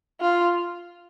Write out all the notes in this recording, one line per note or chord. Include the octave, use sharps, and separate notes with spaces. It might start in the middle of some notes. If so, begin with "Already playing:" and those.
F4